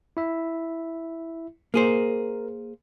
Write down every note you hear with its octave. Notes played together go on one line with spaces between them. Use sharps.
E4 E5
A#3 G#4 A#4 C5